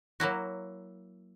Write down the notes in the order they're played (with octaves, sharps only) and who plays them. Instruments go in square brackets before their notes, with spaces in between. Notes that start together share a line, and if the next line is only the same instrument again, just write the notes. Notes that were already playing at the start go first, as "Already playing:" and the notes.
[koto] F#3 A#3 E4 F#4